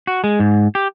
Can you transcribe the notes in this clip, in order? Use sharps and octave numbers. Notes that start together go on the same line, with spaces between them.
F#4
G#3
G#2
G4